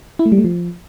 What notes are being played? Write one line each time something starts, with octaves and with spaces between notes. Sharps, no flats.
E4
A3
G3
A3
F3